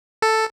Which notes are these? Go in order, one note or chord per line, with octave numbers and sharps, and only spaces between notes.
A4